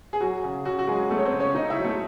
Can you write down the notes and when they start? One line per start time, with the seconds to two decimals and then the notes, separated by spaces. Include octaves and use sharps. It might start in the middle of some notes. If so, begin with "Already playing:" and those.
0.13 G#4
0.20 F#3 F#4
0.44 C#3
0.65 C#3 F#4
0.79 F#4
0.87 F#3 G#3 G#4
1.10 F#3 A3 A4
1.18 C#5
1.25 C4 C5
1.32 C#3
1.40 C#4 C#5
1.55 C#3 D#4 D#5
1.70 E4 E5
1.78 F#3
1.84 A3 A4